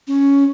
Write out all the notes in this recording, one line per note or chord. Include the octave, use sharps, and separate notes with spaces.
C#4